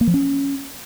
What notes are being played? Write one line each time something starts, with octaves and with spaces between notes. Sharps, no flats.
A#3
F3
C#4